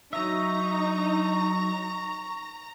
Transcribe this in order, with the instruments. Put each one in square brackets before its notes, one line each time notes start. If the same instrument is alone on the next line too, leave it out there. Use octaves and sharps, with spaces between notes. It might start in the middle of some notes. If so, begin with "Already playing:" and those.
[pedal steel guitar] F#3 E5 [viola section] D#4 [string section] A#5 [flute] C#6